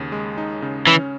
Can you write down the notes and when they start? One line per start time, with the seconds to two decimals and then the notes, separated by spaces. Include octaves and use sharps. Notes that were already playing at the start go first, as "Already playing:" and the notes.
Already playing: D#2 C#3
0.12 G#3
0.38 D#4
0.62 C#3
0.87 E3 C#4